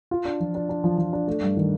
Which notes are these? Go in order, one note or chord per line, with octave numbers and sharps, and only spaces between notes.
F4
D4
F3
D4
D4
F3
F3
D4
A3
G2
D#3